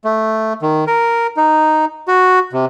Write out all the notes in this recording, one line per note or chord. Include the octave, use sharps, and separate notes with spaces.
A3
D#3
A#4
D#4
F#4
C3